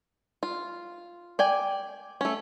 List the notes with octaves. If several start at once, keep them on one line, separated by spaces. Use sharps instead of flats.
F4
D5 G5 G#5
A3 C#4